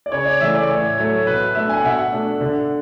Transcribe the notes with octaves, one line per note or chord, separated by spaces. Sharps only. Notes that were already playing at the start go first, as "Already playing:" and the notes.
D5
C#3 C#5
D5
E3 A3 E5
D5
A2 C#5
F#3 A3 C#5
B2 B4
A3 D4 E5
G#5
F#5
B2 E5
F#5
A3 D4
D3